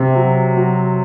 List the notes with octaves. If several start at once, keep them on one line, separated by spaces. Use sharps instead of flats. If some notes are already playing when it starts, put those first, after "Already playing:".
Already playing: C3
F#3
F#3